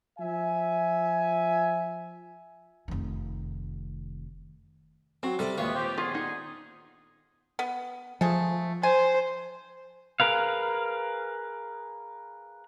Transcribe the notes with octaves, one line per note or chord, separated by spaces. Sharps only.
F3 E5 G#5
F1 D#3
F#3 C4
C3 G3 A4
A#1 D#2 E3 G#3 B3 C#5 F5
C4 F4 G4
D3 B3 F4 G#4
D#4
B3
F3 A3 G#4
C5 G#5
G#4 A#4 B4 F5